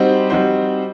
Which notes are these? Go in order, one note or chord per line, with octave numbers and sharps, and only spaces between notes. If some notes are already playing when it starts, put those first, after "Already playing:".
Already playing: G3 C4 D#4 F#4 C5
G3 C4 D#4 F#4 C5